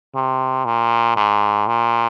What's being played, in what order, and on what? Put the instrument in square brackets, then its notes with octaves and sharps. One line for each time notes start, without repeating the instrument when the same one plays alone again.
[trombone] C3
A#2
G#2
A#2